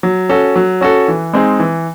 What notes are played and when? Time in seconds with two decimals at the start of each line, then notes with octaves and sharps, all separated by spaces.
0.03 F#3
0.29 C#4 F#4 A4
0.56 F#3
0.81 C#4 F#4 A4
1.08 E3
1.33 G#3 C4 D#4 G#4
1.60 E3